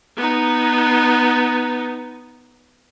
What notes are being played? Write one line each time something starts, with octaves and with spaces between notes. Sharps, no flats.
B3 D#4